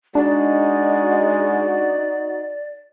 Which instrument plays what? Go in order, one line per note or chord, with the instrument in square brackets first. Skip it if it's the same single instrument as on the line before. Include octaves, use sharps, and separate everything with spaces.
[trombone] G#3 [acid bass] D4 [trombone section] D#4 F#4 [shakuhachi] D5